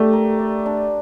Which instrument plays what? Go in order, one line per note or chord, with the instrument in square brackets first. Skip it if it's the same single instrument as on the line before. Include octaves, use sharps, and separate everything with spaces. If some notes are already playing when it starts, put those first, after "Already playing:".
Already playing: [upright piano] A3 [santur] D4 G4 D5
[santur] A#4
D5
D4